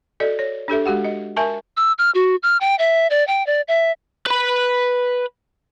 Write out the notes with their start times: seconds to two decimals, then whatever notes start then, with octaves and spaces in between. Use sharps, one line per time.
0.20 F#4 A4 D5 D#5
0.39 C#5
0.68 D4 G4 A4 E5
0.86 G#3 F#4 G4 F#5
1.04 D#5
1.36 A#4 E5 G#5 A5 C#6
1.77 E6
1.98 F6
2.15 F#4
2.43 F6
2.61 G5
2.79 E5
3.10 D5
3.28 G5
3.47 D5
3.68 E5
4.26 B4 B5